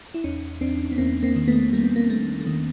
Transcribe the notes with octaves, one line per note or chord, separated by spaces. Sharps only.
E4
E2 C#4 D#4
E2 C4 D4
B3
E2 A#3 C4
A#3 C4
D#3
A3 B3
G3 A#3
B3
A#3
G3 A3
A3
D#3 A#3